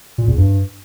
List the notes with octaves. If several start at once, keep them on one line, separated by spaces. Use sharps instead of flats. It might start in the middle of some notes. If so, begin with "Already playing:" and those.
A#2
E2
G2